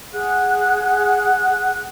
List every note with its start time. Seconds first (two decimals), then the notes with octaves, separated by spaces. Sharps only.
0.13 G#4 F#5 F#6